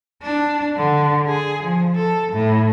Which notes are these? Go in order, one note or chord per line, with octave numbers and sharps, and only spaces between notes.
D4
D3
G#4
F3
A4
A2